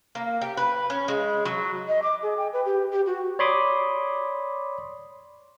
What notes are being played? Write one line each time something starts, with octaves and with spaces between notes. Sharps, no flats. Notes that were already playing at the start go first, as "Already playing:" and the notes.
A#3
G4
B4
C#4
G#3
F#3
D#5
D6
G#4
G5
B4
G4
G4
F#4
C#5 D5 B5 C6 D6 D#6